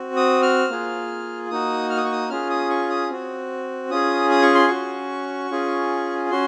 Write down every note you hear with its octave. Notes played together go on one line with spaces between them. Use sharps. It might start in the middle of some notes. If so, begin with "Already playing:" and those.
Already playing: C4 F#4
D#6
F6
A#3 F4 G#4
A#3 D#4 F#4 D#6
F6
D#6
C#6
D#6
C#4 F4 G#4 F6
D#6
C#6
D#6
C4 F#4
C#4 F4 G#4 D#6
D#6
C#6
C6
C#4 F#4 C#6
C#4 F4 G#4
C#4 F#4 C6